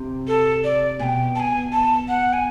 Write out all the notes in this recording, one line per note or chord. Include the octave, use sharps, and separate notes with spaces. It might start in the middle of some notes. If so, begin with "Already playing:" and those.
Already playing: C3
A4
D5
B2 G5 G#5
A5
G#5
A5
F#5
G#5